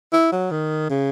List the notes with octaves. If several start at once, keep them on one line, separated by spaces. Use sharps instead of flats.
E4
F#3
D#3
C#3